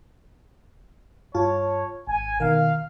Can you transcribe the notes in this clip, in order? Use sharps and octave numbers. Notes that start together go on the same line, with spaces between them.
G2 F4 C#5 A5
G#1 G#5
B2 D#3 A#4 F5